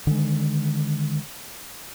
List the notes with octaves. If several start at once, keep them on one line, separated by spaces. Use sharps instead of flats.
D3 D#3 G#3